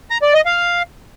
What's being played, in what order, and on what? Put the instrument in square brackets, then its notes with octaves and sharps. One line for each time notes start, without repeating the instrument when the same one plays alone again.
[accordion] A#5
D5
D#5
F5